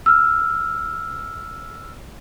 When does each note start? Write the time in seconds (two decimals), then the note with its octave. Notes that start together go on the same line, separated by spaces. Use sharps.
0.06 E6 F6